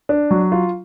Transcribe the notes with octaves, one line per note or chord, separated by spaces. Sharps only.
D4
F#3
F4